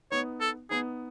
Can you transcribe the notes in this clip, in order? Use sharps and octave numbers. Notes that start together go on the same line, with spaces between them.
B3 D#4 C#5
A4
B3 D#4 G#4